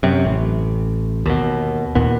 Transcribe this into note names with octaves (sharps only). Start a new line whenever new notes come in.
F#2 C3
A1
D#2 B2
D#2 A#2 B3